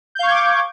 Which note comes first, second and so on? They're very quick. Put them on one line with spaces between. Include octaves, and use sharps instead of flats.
G6 F5 C#6 G#6 D6